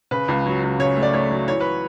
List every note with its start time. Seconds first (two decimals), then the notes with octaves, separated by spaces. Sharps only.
0.11 C#3 B4
0.28 C#2
0.46 F#3
0.63 C#2
0.79 C#3 C#5
0.97 A3
1.02 D5
1.13 A3 C#5
1.31 F#3
1.48 E3 C#5
1.60 B4